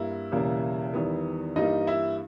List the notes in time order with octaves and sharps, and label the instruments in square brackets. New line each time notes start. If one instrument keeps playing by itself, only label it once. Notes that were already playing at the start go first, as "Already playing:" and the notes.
Already playing: [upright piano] G2 G3 A#3 E4
E1 E2 C#3 G3 A#3
E2 D#3 G3 B3
G2 E3 G3 A#3 D#4 D#5
E4 E5